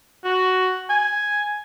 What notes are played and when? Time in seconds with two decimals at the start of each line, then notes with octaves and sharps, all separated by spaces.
0.25 F#4
0.90 G#5